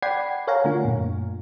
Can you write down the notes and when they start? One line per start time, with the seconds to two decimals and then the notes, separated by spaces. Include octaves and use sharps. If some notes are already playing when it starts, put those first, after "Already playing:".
0.03 D5 F#5 G5 B5 G#6 C7
0.47 A#4 C#5 F5 F#5 G#5 A#5
0.65 D3 A3 D4 F4
0.85 F#2 A#2